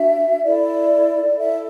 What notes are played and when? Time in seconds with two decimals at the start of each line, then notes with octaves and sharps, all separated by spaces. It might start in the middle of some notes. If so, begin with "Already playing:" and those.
Already playing: D4 F#4 E5
0.43 E4 A4 D5
1.37 E4 A4 E5